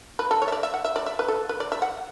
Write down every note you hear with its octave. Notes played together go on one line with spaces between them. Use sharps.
B4
A4
C#5
E5
D5
E5
F#5
E5
D5
E5
B4
A4
B4
D5
E5
F#5